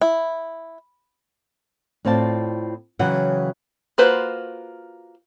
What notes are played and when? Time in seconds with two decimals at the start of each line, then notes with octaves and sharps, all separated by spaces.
0.01 E4
2.05 A2 C4 F4 D5 A5
2.99 C#3 E3 F#3 F#5 G5
3.98 A#3 F4 F#4 B4 C5